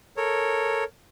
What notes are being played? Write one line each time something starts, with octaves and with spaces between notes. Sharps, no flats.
A4 A#4 C#5